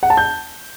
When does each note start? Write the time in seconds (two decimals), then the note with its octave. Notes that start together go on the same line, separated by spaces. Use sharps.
0.03 F#5
0.10 A5
0.17 G6